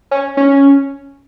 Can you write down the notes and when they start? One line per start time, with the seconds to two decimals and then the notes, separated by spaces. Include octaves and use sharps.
0.11 C#4
0.37 C#4